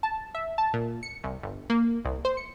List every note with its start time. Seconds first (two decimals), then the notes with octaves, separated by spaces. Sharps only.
0.03 A5
0.35 E5
0.58 A5
0.74 A#2
1.03 C#7
1.24 C2
1.43 G1
1.70 A#3
2.05 C2
2.25 C5
2.37 C#7